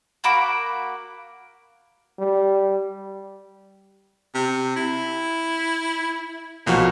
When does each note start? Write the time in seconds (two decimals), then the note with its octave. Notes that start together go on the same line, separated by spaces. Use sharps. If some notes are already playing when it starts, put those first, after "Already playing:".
0.24 A#3 F#4 B5 D6
2.19 G3
4.35 C3
4.76 E4
6.67 B1 A#2 F3 F#4